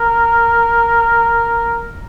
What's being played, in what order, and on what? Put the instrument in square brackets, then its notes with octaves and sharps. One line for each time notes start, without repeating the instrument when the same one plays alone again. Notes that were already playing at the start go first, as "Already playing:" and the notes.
Already playing: [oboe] A#4